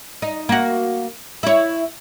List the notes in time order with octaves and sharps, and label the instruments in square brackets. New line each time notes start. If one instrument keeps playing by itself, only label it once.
[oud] D#4
A#3 F#4
E4 C#5